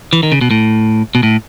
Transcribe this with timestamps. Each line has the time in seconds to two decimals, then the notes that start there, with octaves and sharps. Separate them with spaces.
0.13 E3
0.23 D#3
0.32 C#3
0.41 B2
0.51 A2
1.15 B2
1.23 A2